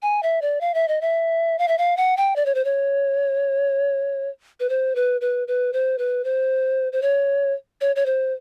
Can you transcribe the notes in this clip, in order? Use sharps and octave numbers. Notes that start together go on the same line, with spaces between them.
G#5
E5
D5
F5
E5
D#5
E5
F5
E5
F5
F#5
G5
D5
C#5
C5
C#5
B4
C5
B4
B4
B4
C5
B4
C5
C5
C#5
C#5
C#5
C5